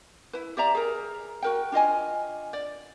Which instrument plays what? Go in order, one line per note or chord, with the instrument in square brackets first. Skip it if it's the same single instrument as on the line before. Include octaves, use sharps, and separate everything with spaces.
[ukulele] E4 B4
G4 D5 E5 A#5
G#4 A#4
F#4 A#4 G5
D4 F4 D#5 G#5
D5